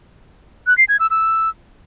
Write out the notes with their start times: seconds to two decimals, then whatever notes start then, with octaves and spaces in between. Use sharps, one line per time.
0.67 F#6
0.78 C7
0.89 G#6
1.00 E6
1.10 E6